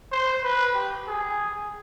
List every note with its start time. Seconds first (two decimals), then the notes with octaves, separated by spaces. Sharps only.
0.12 C5
0.43 B4
0.74 G4
1.07 G#4